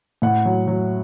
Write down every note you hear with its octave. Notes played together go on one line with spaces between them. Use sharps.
A2 F#5
F#3
F#3